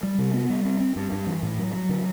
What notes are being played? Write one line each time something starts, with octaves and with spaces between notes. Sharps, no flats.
G3
C3
B3
G3
C4
C4
G2
G2
E3
A2
F#3
F#3
D3